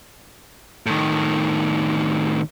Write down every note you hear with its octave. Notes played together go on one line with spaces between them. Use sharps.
A2 D#3